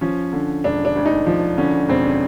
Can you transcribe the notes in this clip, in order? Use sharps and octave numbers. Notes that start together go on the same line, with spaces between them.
F3 C#4
D3
E1 D4
D4
D2
D#4
F3
D3 C#4
E1 C4
C#4